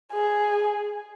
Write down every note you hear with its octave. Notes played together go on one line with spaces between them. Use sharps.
G#4